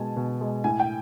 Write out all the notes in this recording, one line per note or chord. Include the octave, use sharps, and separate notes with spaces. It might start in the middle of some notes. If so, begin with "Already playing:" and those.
Already playing: B2 G#3 G#5 A5
B2
G#3
A2 G#5
G5